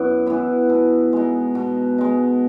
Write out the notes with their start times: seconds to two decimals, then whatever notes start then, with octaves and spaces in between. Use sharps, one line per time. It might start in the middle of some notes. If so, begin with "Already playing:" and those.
Already playing: F#2 B3 E4
0.26 E3 B3 E4
0.69 B2
1.13 G#3 D#4
1.55 B2
1.98 G#3 D#4